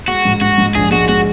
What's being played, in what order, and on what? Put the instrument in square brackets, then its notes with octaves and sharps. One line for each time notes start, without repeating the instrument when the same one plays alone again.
[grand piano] G#3 [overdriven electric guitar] F#4
[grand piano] G#2
[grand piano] G#2 [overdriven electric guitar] F#4
[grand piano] G#2
[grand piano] A#1 [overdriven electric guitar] G#4
[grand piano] G#3 [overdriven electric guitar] F#4
[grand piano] G#3 [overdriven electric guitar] F#4